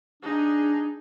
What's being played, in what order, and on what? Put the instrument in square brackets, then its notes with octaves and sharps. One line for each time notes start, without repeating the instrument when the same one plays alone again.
[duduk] D4 [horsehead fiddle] D#4 G#4